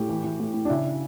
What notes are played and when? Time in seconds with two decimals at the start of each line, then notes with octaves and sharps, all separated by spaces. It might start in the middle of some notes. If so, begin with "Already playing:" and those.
Already playing: A2 G4
0.09 E3
0.24 E3
0.40 A2
0.54 A2
0.65 D4
0.70 C#3 E4